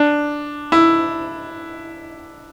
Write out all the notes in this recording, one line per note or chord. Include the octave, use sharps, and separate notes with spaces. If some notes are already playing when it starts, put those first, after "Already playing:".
Already playing: D4
E4